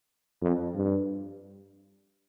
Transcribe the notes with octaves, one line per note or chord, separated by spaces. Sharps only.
F2
G2